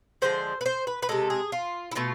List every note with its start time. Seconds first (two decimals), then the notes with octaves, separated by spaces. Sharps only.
0.22 D3 F3 G#3 C5
0.61 B4
0.66 C5
0.87 B4
1.02 B4
1.09 C3 G#3 A4
1.30 G#4
1.52 F4
1.92 E4
1.95 B2 A3 F4